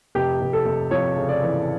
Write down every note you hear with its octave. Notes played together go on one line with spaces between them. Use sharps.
F1 G4
F1
A4
F1
F2 C#5
C#3
D5
E3